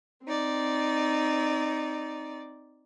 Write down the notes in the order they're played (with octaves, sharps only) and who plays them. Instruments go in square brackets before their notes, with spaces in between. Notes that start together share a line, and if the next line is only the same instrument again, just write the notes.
[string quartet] C4 D#4 D5